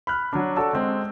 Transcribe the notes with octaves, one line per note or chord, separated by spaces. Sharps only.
B5 F6 F#6
F#3 D4
F#4 A4 D5 A5 E6
G#3 C4